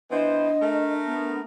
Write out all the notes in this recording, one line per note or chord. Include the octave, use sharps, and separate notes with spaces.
E3 B3 D4 C5 D#5
A3 A#4
B3